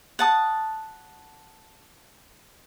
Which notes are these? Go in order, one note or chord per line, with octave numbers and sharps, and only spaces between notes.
F#5 A5 D#6